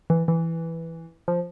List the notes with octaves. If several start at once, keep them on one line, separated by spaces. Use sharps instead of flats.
E3
E3
F3